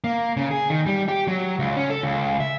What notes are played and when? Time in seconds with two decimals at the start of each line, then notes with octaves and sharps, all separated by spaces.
0.04 A#3
0.37 C#3
0.51 G#4
0.70 D#3
0.86 G3
1.08 G4
1.28 F#3
1.59 C#2
1.77 C#4
1.90 A4
2.03 C#2
2.40 E5